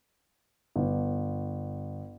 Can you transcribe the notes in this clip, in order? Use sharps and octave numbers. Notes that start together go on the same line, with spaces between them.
G1